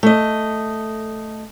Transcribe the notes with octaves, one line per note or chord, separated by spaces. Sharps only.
A3 D#5